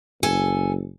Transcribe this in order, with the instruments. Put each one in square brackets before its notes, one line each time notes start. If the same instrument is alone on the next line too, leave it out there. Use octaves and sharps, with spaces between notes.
[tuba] F#1 [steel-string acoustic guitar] A4 G#5